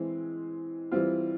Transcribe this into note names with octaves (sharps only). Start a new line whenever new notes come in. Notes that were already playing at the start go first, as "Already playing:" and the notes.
Already playing: E3 G#3 C4
E3 G3 C4 F4